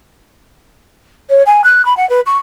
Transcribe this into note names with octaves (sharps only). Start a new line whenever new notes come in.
C#5
G#5
F#6
B5
F#5
B4
C#6